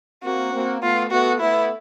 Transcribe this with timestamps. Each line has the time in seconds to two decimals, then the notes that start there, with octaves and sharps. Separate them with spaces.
0.24 A#3 C4 F#4
0.53 A#3 C4
0.82 A3 B3 F4
1.11 A3 B3 F#4
1.40 A3 B3 E4